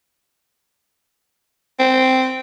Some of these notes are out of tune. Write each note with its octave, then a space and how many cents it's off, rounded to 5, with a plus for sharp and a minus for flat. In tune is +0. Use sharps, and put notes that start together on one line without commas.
C4 -10